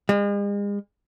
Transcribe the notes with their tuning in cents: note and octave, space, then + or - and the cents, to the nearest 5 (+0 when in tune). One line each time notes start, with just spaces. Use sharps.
G#3 -40